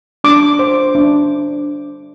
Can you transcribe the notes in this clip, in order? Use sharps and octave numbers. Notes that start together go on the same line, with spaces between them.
D4 D6
C5
D4